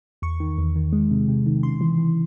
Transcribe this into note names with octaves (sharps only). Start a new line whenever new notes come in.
E2 C#6
D#3
E2
D#3
G#3
C3
C3
D#3
C#3 C6
E3
E3